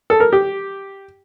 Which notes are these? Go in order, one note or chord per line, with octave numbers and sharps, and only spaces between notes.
A4
A#4
G4